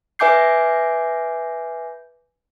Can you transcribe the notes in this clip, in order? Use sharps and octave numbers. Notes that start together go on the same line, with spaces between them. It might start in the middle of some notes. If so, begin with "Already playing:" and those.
B4 E5 G#5 D6 G6 C7